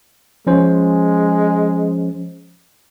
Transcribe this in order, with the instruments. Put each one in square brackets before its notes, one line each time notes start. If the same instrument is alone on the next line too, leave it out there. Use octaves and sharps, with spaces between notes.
[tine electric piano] F3 C#4 C5 [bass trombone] G#3